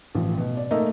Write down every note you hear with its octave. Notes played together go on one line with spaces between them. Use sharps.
A1 F3
B2
D5
A3 A#3 D#4 D#5